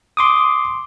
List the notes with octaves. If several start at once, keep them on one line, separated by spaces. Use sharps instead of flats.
C6 D6 D#6